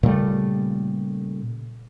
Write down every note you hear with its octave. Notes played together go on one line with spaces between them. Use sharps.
A#2 C#3 G3 A3